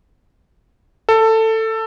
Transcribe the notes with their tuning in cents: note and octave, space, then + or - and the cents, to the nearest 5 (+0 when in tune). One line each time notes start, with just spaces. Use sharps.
A4 +15